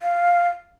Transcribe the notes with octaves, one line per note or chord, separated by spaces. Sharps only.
F5